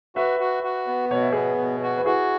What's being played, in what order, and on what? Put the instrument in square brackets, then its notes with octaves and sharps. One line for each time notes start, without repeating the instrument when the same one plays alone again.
[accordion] F#4 [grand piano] B4 E5
[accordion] F#4
F#4
B3
[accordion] B2 [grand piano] C#5
[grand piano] E5
[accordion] B3 [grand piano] G#4 C#5
[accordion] B2
F#4
[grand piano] B4
[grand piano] E4 G#4 [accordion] F#4